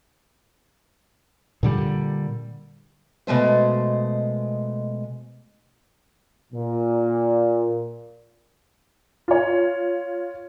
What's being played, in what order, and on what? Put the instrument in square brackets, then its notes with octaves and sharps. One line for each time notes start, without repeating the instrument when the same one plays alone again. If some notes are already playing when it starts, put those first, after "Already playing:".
[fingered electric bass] A#2 D3 G3
[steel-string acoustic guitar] B2 G#3 A3 C5
[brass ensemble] A#2
[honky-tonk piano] F4 C#5